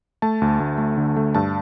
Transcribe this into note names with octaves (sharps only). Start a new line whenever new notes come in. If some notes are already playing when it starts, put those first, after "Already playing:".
A3 A5
D2
D2
A3
D3
A3
G2 A5